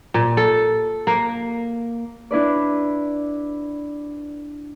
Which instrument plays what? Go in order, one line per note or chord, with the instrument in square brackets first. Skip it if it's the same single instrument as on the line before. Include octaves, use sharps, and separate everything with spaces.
[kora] A#2
A4
A#3
[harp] D4 E4 B4 D5